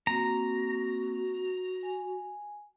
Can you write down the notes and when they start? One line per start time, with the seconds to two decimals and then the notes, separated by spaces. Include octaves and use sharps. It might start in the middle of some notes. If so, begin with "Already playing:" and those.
0.07 A#3 C4 F#4 A#5
1.83 G#5